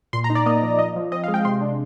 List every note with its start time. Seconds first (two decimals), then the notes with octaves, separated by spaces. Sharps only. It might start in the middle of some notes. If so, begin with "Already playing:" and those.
0.13 A#2 C6
0.24 A#5
0.30 D#4
0.35 D5
0.46 A#3 D#5
0.62 F3
0.79 F3 D#5
0.96 F3
1.12 C4 D#5
1.24 F5
1.28 G#3
1.34 G5
1.45 C3 C6
1.61 D4